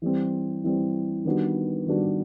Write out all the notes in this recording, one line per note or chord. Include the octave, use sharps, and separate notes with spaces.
E3 G3 C4
E3 G3 C4
D#3 G3 B3 D4 F#4
D#3 G3 B3 D4 F#4